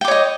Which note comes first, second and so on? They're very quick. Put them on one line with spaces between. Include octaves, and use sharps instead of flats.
G5 D6 C#5 D#5